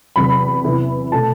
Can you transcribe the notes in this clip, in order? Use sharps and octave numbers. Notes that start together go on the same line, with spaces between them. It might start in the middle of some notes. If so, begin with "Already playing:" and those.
E2 C3 F#3 B5
C3 E3 B3 E4
B2 A3 E4 A5